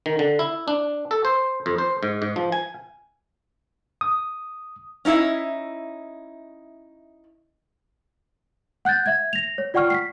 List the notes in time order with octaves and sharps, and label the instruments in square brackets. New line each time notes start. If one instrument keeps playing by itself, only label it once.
[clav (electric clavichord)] D#3
D3
E4
D4
A4
C5
F2
C5
G#2
G#2
F3
G#5
[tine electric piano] D#6
[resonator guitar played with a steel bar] C#4 D#4 E4 E5
[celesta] F#5 F#6 G6 A6
E5 G#6
A#6 F7
C#5
F4 D5 F#5 G5 C#6 F6
B6 C7